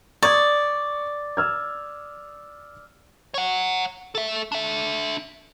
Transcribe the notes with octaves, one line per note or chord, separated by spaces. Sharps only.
D5 C#6 D#6 G#6
E6 F6 G#6
C#5 F#5
A4 E5
D4 E5